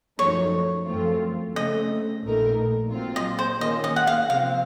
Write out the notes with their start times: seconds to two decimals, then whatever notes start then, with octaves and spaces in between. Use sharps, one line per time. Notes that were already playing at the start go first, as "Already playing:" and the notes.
0.19 F#2 F3 A3 D#4 C#5
0.88 F#2 F3 A3 C4 F4
1.56 C#3 A3 C4 D#5
2.24 A#1 A#2 A3 D#4 A#4
2.92 A#2 F#3 C4 F4
3.16 D#5
3.39 C5
3.61 D#3 A#3 C#4 F4 D#5
3.84 D#5
3.96 F#5
4.07 F5
4.30 C3 F3 C4 F5